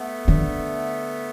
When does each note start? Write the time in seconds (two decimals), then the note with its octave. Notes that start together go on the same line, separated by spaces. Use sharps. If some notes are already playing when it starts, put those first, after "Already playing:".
Already playing: A3 B3
0.28 D3